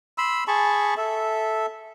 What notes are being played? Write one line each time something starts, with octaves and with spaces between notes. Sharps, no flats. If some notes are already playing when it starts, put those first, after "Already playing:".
B5 C6 E6
G#4 A5 B5 C#6
A4 E5